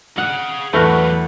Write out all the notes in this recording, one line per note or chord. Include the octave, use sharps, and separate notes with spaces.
G#4 F5 F#5
E2 E3 F#3 A3 F#4 B4 F6